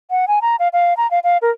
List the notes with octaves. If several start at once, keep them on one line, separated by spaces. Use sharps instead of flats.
F#5
G#5
A#5
F5
F5
A#5
F5
F5
A#4